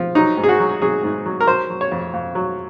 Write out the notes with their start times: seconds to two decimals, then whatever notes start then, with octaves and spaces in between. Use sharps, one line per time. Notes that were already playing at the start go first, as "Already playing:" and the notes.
Already playing: F3
0.15 F#3 D#4
0.37 G#2
0.44 G#4
0.49 F#4
0.59 F#3
0.82 F#3 G#4
1.03 G#2
1.26 F#3
1.41 A#4
1.48 F#3 C5
1.70 F#3
1.81 C#5
1.92 F2
2.14 F2
2.35 F#3